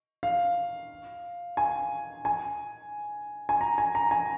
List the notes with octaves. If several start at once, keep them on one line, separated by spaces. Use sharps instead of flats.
F5
G#5
G#5
G#5
A#5
G#5
A#5
G#5